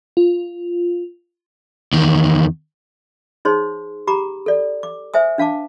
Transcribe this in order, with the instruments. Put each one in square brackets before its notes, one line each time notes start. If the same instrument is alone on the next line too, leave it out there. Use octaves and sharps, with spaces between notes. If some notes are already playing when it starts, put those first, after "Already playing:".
[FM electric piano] F4
[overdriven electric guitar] E2 D#3
[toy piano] D#4 G#4 C5 C#5 C6
G4 A#5 B5 D6
A4 D5
D6
C5 E5 G#5 D#6
D4 F5 A5 D6